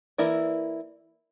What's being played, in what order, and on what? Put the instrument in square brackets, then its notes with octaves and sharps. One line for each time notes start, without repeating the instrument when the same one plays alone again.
[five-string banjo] E3 A#3 E4 A#4 D5